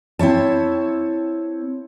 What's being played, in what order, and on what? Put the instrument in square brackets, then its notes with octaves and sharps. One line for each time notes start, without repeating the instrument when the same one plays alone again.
[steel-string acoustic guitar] C4 E4 C#5 A5